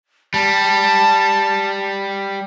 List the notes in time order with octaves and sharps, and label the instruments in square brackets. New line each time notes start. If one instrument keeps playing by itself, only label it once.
[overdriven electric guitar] G3 [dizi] A5